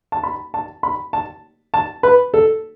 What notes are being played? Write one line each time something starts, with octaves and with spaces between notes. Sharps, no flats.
A5
B5
A5
B5
A5
A5
B4
A4